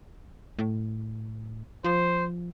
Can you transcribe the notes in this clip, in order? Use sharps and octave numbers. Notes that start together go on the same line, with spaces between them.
A2
F3 C5